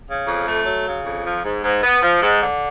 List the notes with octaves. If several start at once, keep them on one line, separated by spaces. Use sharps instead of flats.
C#3
F2
A3
F#3
C#3
F2
F3
G#2
G#2
B3
F3
G#2
D3